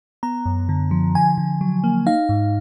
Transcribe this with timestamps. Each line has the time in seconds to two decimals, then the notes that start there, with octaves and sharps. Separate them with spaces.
0.23 B3 A#5
0.46 F#2
0.69 D3
0.91 F3
1.15 D3 G#5
1.38 D3
1.61 F#3
1.84 A#3
2.07 D#4 F5
2.29 G#2